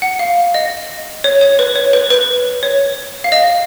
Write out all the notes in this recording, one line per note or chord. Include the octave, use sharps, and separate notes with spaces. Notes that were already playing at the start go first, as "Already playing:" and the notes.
F#5
F5
D#5
C#5
C#5
B4
C#5
B4
B4
C#5
F5
D#5